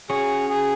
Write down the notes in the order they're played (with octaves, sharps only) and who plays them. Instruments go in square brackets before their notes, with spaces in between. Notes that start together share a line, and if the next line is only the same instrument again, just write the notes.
[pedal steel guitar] C#4 F#4 C#5 [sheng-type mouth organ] G#4
[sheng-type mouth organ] G#4